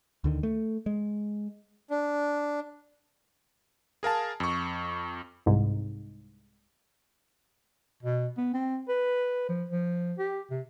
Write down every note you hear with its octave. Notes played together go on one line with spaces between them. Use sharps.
D2 D3 D#3
A3
G#3
D4
G#4 A#4 F5 A5
F2 C#6
C2 G#2
B2
B3
C4
B4
F3
F3
G4
C3